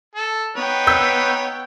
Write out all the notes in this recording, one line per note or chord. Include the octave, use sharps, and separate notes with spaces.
A4
B3 D#4 B4 C#5 G5
E6 G6 B6